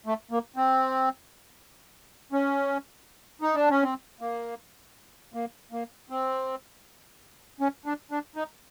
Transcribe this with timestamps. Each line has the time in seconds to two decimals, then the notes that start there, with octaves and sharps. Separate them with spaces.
0.06 A3
0.31 A#3
0.56 C4
2.33 C#4
3.42 D#4
3.55 D4
3.70 C#4
3.83 C4
4.21 A#3
5.34 A#3
5.72 A#3
6.10 C4
7.60 C#4
7.86 D4
8.11 D4
8.36 D#4